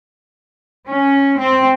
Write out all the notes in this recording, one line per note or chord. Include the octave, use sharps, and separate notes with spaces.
C#4
C4